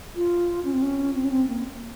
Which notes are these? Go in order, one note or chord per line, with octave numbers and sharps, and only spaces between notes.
F4
C#4
C4
C#4
C4
C#4
C4
A#3